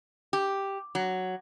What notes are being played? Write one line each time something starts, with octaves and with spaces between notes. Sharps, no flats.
G4
F#3